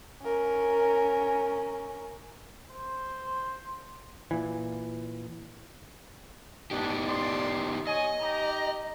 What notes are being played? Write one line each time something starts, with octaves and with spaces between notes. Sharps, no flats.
C#4 A#4
C5
A#2 E3
B3 D4 D#4 G4
D5 C6
C#5 D#5 G#5 D#6
D#4 G4 A#5